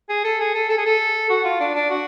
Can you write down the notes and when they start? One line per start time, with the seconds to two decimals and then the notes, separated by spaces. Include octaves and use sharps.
0.09 G#4
0.24 A4
0.40 G#4
0.55 A4
0.69 A4
0.78 G#4
0.86 A4
1.29 F#4
1.45 F4
1.60 D4
1.75 D4
1.90 F#4